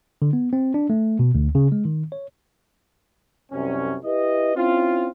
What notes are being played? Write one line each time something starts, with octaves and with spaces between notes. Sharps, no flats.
D3
B3
C4
D4
A3
B2
D2
C#3
G#3
D#3
C#5
C2 F#2 C3 C#4
E4 G4 B4 D#5
C4 C#4 E4 F4